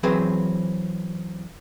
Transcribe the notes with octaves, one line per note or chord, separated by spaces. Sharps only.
E3 F#3 C4 G#4 B4 C5